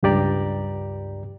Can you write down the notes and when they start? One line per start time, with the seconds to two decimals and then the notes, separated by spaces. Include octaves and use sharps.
0.03 C#2 G2 G4 D5 A#5